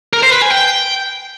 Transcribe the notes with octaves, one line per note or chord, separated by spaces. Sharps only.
A#4
C5
B4
G#5
G5